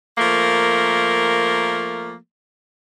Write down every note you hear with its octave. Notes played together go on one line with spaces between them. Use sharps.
F3 A3 A#3 A#4